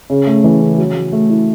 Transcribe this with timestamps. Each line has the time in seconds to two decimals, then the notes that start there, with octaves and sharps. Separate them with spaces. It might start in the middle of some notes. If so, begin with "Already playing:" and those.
0.10 C#3
0.26 A3
0.44 E3
0.61 C#3
0.78 F#3
0.96 F#3
1.12 A3
1.30 E4